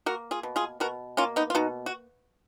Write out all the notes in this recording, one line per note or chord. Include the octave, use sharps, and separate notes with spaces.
A#3 F#4 A#4
F4 G#4
B2
F4 G#4
B2 F#4 A#4
A#3 C#4 F4
B3 D#4
F4
B2 D#4 F#4
F#4